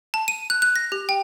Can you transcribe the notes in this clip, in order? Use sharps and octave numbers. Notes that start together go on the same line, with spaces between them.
A5
D#7
F#6
F#6
A#6
G4
G5